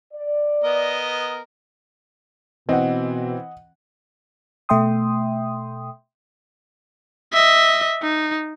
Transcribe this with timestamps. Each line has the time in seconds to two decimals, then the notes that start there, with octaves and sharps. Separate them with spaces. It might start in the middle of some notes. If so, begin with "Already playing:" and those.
0.13 D5
0.64 B3 A#4 D#5
2.69 B2 E3 C4 D#5 F#5
4.69 B2 A3 E5 G5 C6 D#6
7.33 D#5 E5
8.02 D#4